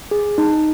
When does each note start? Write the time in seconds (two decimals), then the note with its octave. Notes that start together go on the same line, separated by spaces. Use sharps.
0.11 G#4
0.38 D#4